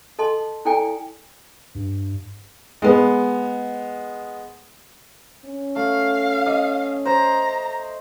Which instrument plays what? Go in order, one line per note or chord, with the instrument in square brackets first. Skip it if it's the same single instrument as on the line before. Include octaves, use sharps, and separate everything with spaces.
[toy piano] A4 D#5 A5 C6
E4 A4 D5 G5 G#5 A#5
[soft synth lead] G2
[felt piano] G#3 B3
[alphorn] C#4
[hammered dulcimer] A3 [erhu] F5
[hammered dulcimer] D#5
[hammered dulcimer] C5 [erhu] A#5